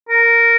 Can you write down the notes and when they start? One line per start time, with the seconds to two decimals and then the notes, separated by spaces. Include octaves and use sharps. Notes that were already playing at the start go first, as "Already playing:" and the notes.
0.09 A#4